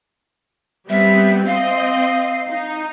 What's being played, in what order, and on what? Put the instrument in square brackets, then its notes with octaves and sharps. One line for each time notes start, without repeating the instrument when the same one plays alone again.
[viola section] G3 B3 C4 [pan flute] E5
[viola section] C4 D#5 C6 [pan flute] F5
[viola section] D#4